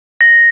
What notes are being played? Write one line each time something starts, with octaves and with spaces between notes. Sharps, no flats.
A#6